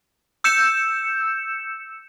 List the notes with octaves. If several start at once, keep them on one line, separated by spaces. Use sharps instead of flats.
E6 G6 C#7 E7